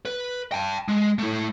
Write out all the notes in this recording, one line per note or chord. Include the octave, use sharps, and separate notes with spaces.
B4
G5 A5
G#3
A3 E4